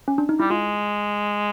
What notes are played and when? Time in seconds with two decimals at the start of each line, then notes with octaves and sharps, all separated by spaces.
0.08 C#4
0.18 D4
0.29 D#4
0.40 G3 E4
0.50 G#3 F4